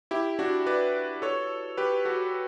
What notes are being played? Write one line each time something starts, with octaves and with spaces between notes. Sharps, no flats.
E4 G4
D4 F#4
B4 D5
A4 C#5
G4 B4
F#4 A4